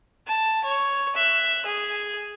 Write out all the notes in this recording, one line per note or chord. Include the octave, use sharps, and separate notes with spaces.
A5
C#5
E5 F#6
G#4